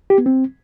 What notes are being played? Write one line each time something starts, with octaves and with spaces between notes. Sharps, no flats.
G4
B3
C4